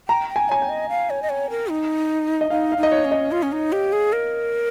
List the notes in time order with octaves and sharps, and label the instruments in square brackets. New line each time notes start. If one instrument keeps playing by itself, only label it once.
[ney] G5 [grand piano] A#5
[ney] G5
[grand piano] G#5
[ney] C#5 [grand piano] G#5
[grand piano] G5
[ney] D#5
F5
C#5
D#5
C#5
A#4
D#4
[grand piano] D#5
[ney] D#4 [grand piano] F5
[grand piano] F5
[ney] D#4
[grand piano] D#5
C#5
[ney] C#4
[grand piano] D#5
[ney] F4
C#4
D#4
G4
G#4
A#4